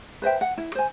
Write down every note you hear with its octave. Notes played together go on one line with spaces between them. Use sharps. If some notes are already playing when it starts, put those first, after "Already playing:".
B4 C5 E5 G5
F#5
E4
C5 G#5